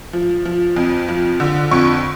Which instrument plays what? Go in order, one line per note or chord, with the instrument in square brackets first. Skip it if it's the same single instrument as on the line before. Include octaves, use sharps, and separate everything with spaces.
[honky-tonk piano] F3
F3
F2
F3
D3
F2 C#6